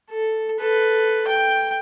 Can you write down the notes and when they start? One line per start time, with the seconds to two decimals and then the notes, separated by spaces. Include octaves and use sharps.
0.10 A4
0.59 A4 B4
1.28 G5